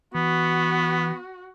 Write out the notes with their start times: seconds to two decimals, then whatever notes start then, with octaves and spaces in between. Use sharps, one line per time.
0.15 E3 B3 F#4